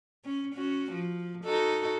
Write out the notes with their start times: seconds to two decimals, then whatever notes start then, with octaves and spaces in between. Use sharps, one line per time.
0.25 C#4
0.54 C#4 F#4
0.92 F3
1.45 D#4 F#4 A4